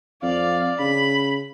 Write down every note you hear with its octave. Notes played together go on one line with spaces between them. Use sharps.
F2 D5 F5
C#3 B5